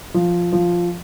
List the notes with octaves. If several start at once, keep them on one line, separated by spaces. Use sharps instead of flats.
F3
F3